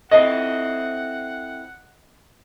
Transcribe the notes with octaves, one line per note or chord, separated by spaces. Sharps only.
C4 E4 A4 D#5 F#5